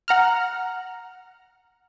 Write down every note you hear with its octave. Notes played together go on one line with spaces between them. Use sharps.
F#5 A#5 F6